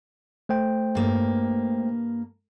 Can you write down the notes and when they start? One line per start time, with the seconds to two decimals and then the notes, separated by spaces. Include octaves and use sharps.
0.49 A3 C5 G5
0.95 G2 A#3